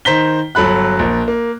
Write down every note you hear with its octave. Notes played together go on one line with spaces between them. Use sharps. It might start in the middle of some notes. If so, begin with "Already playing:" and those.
D#3 C5 A#5 B6 G7
G1 F#3 A4 B5 F#6
A#1 A#4
A#3